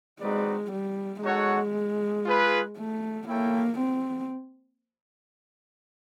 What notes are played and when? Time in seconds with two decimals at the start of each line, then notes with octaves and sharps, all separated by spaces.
0.21 G#3 C4 D#4 F#4 B4 D5
0.72 G3
1.23 G#3 D#4 F#4 A4 C#5 F#5
2.26 F4 G#4 B4
2.78 A3
3.28 A#3 E4 A4 C#5 E5 G5
3.79 C4